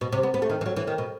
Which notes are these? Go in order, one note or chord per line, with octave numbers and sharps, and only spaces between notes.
B2
C3
B3
B3
A3
D#3
E3
F#3
E3
D#3
B2